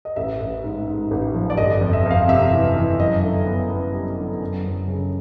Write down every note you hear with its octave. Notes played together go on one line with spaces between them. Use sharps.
D#5
A1 E5
A1
G#2
G#2
A1
F3
D5
G1 D#5
F2
E5
F2
F5
C3 E5
E3
E3
F#2 D#5
D3
B3
B3
G3
D3
F#2
F#2
C#3